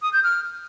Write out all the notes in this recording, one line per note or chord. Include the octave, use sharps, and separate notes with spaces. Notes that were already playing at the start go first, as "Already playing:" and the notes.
D#6
G6
F6